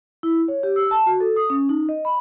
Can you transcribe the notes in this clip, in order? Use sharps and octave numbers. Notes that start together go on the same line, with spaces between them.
E4
C#5
G4
E6
A5
F#4
A4
D#6
C#4
D#4
D#5
B5